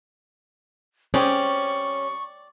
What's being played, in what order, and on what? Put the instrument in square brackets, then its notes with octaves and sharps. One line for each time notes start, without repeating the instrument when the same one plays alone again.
[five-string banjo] G3 C4 G#4 [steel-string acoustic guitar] C#4 [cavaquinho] D5 G5 [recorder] C#6